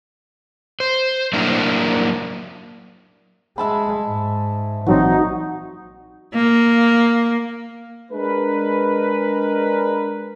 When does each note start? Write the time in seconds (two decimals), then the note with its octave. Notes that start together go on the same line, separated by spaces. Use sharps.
0.80 C5
1.33 F#3 A#3 D4 E4 A#4
3.58 G#3 E5 A5 B5
4.06 G#2
4.86 A#1 E3 F#3 C4 D#4 F#4
6.35 A#3
8.11 G#3 D4 A#4 B4